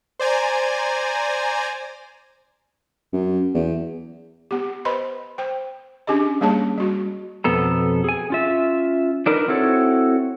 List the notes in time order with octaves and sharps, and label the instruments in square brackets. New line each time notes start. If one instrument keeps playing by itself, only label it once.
[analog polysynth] C5 D5 G#5 A#5
[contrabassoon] F#2
E2
[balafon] B3 G4
B4 C5 D#5 B5 C6
C5 G5
C#4 D4 G4 G#4 D#5
G3 A#3 C#4 G#4 C#5 A5
G3 F#4
[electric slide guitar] F2 B2 B3 A4 A#5
G#4 G#5
C#4 F4 E5
D4 D#4 A#4 B4
C4 E4 F#4 A4 C#5